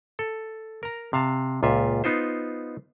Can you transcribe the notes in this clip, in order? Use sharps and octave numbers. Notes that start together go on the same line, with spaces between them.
A4
A#4 A#5
C3 F5 A5
C#2 A#2 F4 E5
B3 D#4 F4 C5